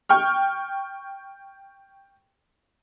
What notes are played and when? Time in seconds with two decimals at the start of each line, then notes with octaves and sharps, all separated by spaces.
0.09 G5 C#6 F6